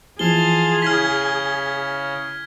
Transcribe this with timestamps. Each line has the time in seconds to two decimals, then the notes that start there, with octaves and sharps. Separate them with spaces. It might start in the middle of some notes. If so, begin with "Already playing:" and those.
0.19 E3 F3 G#4 F5 A5 C6 G7
0.82 C#3 E4 F6 G#6 B6